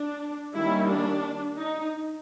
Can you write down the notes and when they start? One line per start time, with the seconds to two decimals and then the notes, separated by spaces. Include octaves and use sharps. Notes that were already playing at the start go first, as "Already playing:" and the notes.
Already playing: D4
0.54 D#3 G3 A#3 C#4 E4
0.89 D4
1.58 D#4